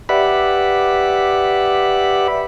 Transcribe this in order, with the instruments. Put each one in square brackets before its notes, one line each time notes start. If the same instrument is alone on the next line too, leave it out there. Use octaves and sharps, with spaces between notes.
[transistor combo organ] G4 B4 D5 E5 F#5 B5